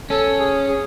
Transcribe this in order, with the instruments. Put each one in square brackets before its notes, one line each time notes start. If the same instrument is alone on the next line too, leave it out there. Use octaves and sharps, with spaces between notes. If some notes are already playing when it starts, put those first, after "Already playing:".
[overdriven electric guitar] C#4 [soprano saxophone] A4
[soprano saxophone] G#4
G#4